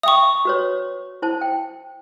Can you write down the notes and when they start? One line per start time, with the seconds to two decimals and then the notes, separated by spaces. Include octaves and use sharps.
0.03 E5 G5 C#6 D#6
0.45 F#4 B4 C#5
1.22 E4 C5 A5
1.41 G5